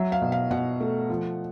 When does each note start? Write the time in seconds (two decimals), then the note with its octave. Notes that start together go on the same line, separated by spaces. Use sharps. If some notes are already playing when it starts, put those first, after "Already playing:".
Already playing: F#3 E5
0.12 F5
0.22 B2
0.32 F5
0.51 B2 F#5
0.80 A3
1.10 F3